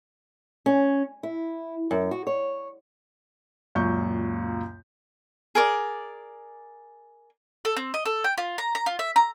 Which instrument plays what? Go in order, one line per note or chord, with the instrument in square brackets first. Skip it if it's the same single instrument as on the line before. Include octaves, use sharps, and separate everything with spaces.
[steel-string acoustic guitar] C#4
E4
F#2
F#4
C#5
[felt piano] C#2 F#2 A#2 C#6 G6
[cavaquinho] G#4 A#4 D5
[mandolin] A4
C4
D#5
A4
G5
F4
A#5
A#5
F4
E5
A#5